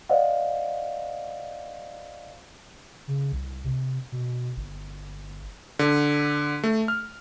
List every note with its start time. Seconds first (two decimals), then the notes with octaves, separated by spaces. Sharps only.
0.09 C5 D5 D#5 F5 F#5
3.08 C#3
3.32 C2
3.64 C3
4.12 B2
4.57 G1
5.79 D3
6.64 A3
6.88 F6